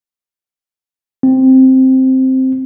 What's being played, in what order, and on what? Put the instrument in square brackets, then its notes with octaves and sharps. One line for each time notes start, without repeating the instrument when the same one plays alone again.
[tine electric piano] C4